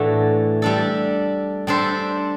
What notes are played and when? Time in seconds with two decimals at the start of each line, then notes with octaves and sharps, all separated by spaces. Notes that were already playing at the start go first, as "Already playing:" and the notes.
Already playing: A2 E3 A3 D4 F#4
0.62 G3 D4 A4
1.67 G3 D4 A4 C5